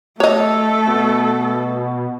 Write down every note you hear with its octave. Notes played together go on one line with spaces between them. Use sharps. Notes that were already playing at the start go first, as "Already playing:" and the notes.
A3 A4 C#5 D#5
B2